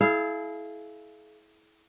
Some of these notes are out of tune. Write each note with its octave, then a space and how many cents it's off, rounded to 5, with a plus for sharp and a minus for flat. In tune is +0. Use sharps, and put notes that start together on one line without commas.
E4 -15 G#4 +45 F5 -15